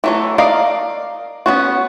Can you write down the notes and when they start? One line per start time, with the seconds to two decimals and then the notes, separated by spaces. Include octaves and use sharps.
0.04 E3 F#3 A3
0.38 A#4 D5 D#5 F5
1.46 B3 C#4 F#4